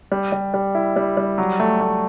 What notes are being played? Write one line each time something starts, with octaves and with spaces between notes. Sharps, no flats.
G3
G3
G3
E4
G3
G3
F#3
A3
A3